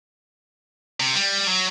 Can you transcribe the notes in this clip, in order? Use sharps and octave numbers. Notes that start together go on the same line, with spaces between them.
C3
G3
F#3